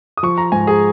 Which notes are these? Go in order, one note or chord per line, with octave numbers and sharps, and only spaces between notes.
D#6
F3 C#6
A#5
G#2 G#5
G#4